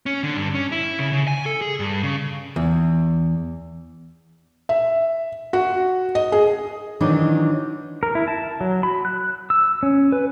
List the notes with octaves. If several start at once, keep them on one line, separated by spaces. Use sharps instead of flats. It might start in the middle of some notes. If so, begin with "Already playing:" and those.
C#4
D3
G2
C#4
E4
C#3
C#3
G#5
A4
G#4
G2
C#3
E2
E5
F#4
D#5
G#4
D#3 E3 F#3 D4 D#4
A#4
E4
A5
F#3
B5
F#6
E6
C#4
B4